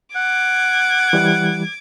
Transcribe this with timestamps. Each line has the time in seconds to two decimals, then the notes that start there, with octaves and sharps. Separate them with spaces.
0.16 F#5 D6 G#6
1.13 E3 G3